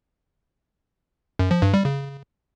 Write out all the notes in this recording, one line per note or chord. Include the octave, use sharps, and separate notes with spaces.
F#2
F3
G2
G3
C#3